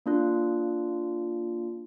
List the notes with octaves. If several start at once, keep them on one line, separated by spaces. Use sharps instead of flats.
A#3 D4 F4